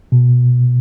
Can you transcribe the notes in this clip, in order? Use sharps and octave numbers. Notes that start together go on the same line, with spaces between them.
B2